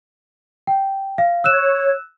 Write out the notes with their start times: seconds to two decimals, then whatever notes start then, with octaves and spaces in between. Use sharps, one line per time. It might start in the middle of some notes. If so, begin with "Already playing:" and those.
0.67 G5
1.18 F5
1.44 C#5 E6 F#6 E7